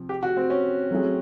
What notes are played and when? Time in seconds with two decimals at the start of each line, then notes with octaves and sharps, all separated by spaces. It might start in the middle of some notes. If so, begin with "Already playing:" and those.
Already playing: C3 F3
0.09 G4
0.23 F#4
0.37 C4
0.50 C#4
0.91 F#3 A3 C4 E4 G#4